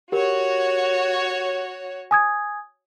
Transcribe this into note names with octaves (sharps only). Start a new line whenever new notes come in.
F#4 G4 A#4 C#5
G#5 D#6 G#6